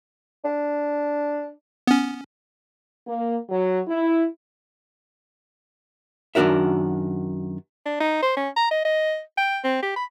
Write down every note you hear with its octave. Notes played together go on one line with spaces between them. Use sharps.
D4
B3 C#4
A#3
F#3
E4
F#2 D#3 D4 F#4 A#4 E5
D4
D#4
C5
C#4
A#5
D#5
D#5
G5
C4
G4
B5